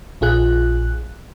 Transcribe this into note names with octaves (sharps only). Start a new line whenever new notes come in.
A#1 F4 G#4 F#6